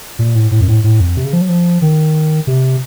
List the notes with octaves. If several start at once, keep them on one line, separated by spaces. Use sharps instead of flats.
A#2
A2
A2
F#2
A2
A2
F2
C3
C#3
F3
F#3
F3
D#3
C3